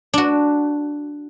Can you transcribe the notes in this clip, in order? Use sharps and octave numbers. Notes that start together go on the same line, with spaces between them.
D4 F#4